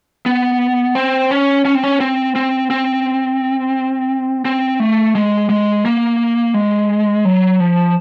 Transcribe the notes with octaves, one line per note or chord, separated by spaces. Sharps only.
B3
C4
C#4
C#4
C4
C#4
C4
C4
C4
C4
A3
G#3
G#3
A#3
G#3
F#3
F3